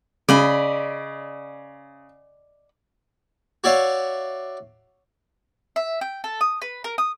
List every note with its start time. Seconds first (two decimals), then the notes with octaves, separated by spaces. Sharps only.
0.29 C#3 D5 D#5 B5
3.64 F#4 C#5 D5 E5 F5
5.76 E5
6.01 G5
6.24 A4
6.41 D#6
6.62 B4
6.84 A#4
6.98 D#6